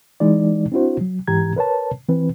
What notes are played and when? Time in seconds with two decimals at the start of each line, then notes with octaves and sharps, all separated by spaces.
0.20 E3 G#3 D#4 D5
0.72 C4 D4 E4 F#4 C5
1.01 F#3
1.28 G#2 E3 G4 A#5 G#6
1.56 A#4 B4 C#5 A5
2.09 E3 C4 B4